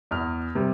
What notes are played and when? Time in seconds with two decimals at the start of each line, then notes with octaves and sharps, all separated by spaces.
0.11 E2 F6
0.55 C3 G3